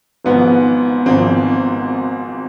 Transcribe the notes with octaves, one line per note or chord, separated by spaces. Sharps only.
G#1 G#2 F3 B3
G#1 G#2 F3 C4